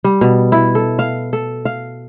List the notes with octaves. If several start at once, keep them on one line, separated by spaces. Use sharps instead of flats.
G3
B2
E4
A4
F5
A4
F5